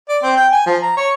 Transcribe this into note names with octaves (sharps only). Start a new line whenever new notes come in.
D5
C4
G5
G#5
F3
A#5
C#5